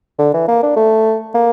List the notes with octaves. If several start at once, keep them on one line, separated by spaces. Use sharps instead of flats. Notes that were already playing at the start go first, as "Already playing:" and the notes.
D3
E3
A#3
D4
A3
A#3